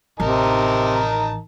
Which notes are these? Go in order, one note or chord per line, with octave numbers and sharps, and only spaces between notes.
A1 C3 D#3 D#4 A#4 A5